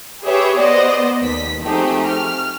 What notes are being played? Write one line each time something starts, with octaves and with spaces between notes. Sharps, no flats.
G4 G#4 B4 C#5 E5
B3 C5 D5 D#5
D#2 B6
F3 A3 C4 D#4 G4 G#4
F6